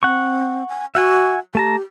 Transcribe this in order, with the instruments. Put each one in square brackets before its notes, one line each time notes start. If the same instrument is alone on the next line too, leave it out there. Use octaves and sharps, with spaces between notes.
[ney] C4 [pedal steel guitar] F#5 C#6
[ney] G#5
[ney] F#4 [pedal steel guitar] E5 F#5 G#5
[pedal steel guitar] A3 A5 A#5 [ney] G4